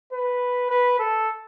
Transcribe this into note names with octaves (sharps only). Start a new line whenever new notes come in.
B4
B4
A4